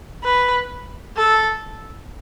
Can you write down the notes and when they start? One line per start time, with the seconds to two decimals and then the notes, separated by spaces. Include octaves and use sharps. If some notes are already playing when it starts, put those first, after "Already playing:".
0.24 B4
1.17 A4